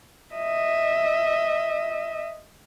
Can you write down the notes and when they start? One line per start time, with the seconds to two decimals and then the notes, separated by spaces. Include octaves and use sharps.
0.35 D#5 E5